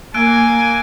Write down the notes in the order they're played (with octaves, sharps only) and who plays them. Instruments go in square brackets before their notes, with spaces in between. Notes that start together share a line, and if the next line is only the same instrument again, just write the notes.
[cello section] A#3 [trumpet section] G#5 [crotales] E6 F#6 D7